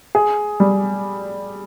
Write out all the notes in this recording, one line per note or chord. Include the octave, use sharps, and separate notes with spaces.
G#4
G3